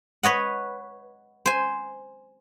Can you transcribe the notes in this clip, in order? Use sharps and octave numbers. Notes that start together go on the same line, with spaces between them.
B4 C#5 D#5 F#5
C5 G#5